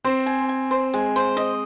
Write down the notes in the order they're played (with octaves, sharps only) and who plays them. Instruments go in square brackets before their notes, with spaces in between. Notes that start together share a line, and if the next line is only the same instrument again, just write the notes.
[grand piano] C4 [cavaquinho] C5
[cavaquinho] G#5
G#5
C5
[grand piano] G#3 [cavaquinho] G#5
[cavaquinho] C5
D#5